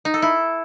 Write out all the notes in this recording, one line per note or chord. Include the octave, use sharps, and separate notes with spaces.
D#4
A4
E4